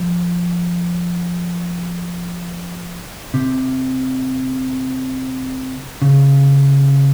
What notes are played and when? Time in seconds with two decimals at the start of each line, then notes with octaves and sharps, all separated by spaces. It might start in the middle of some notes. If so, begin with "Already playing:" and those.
Already playing: F3
3.34 C3
6.02 C#3